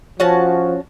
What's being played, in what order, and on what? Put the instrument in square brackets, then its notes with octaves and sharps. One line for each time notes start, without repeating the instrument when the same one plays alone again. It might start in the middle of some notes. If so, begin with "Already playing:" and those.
[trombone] F3 [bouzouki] C#4 F#4 A5